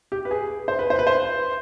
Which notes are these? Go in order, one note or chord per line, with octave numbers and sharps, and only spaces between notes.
G4
B4
G#4
C5
B4
C5
B4
C5